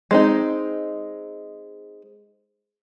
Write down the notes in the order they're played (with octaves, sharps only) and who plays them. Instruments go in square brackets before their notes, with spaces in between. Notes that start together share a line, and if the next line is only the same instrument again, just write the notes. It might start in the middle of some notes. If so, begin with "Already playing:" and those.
[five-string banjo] G#3 C4 D#4